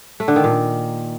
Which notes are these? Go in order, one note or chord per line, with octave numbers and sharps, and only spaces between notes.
A3
D3
D#3
A#2